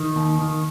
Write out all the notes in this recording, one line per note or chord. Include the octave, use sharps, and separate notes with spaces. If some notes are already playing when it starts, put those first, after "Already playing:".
Already playing: D#3
D#2
D#3